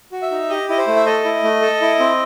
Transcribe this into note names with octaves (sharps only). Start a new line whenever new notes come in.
F#4
E5
D#4
G4 D#5
E4 D#5
C5
A3
E5
A4 D#5
E4
A3
A4
E4
C4